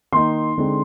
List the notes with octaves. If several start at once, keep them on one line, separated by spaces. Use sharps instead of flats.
D#3 A#3 D#4 C6
D3 G#3 C4 D#4